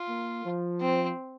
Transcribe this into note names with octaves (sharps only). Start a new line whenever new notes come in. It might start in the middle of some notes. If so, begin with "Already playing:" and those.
Already playing: F4
A#3
F3
C4